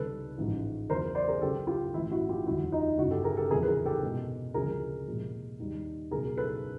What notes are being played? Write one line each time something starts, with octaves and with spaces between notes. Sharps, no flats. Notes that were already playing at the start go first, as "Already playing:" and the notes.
Already playing: C#2 C3 D#3 G3 A4 B4
A1 G#2 F3
E2 C#3 F#3 A#4 C5
C5 D5
G#4 A#4
C#2 C#3 F#3 G4 A4
F4 G4
A1 A2 E3 E4
E4 F#4
F4 G4
F1 D#2 D3 G3 E4 F#4
D#4 F4
G1 F#2 C#3 E4 F#4
G4 A4
G#4 A#4
G4 A4
F#1 E2 C3 F3 G#4 A#4
B4
G#4 A#4
G4 A4
C2 B2 G#3
D2 C#3 F3 G#3 G#4 A#4
C2 A#2 F3 G#3
D#2 D#3 G3
C#2 B2 F#3 G#4 A#4
A4 B4